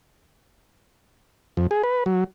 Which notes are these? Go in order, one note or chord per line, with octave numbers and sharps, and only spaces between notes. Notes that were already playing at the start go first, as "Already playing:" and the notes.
F2
G#4
B4
F#3